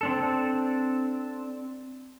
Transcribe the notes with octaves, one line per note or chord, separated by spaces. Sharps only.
C4 D4 A4